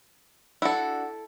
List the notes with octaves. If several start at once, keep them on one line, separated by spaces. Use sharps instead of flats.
D4 E4 F#4 A4